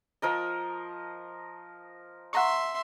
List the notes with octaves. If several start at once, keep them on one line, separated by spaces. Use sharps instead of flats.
F3 A#4 D#5
E5 F#5 A#5 C6 C#6